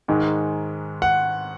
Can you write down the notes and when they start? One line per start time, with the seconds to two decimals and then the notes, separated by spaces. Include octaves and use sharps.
0.08 G#2 D#3 G#3
1.02 F#5